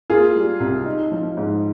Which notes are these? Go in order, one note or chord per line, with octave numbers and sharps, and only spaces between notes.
A#3 F4 G#4
G3
C2
D#4
F3
G#2